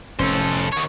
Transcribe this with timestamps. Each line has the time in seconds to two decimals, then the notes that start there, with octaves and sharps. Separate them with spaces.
0.19 F1 A2 C#4 A4 C5
0.73 D#3 C#5